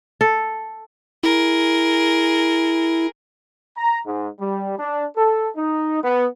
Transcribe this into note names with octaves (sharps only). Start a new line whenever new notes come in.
A4
E4 G#4 A#4
A#5
G#2
G3
D4
A4
D#4
B3